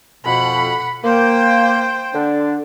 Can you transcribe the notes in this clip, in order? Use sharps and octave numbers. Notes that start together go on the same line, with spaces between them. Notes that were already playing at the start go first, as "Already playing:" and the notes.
F2 B2 F#5 B5
A#3 C5 G5
D3 D4